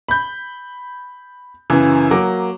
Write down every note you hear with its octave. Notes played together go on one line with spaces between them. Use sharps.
B5 G6
F#2 C#3 E3
F#3 A#3 D6